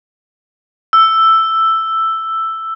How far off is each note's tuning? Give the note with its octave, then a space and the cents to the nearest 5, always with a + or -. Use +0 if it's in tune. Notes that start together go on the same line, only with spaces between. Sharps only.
E6 +5